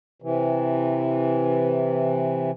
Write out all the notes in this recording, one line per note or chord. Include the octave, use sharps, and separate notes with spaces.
C3 E3